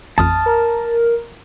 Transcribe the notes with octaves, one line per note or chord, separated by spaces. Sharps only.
A1 F2 A5 D#6 F6
A#4